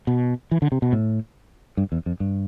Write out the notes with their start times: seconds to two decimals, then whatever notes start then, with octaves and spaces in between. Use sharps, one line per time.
0.07 B2
0.51 E3
0.62 D3
0.72 C3
0.82 B2
0.93 A2
1.77 G2
1.92 E2
2.06 F2
2.20 G2